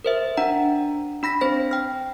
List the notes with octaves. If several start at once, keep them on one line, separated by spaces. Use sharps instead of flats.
A#4 C5 E5
D4 F#5 A#5
D4 B5 A#6 B6
C4 C5 A#6
G5 F6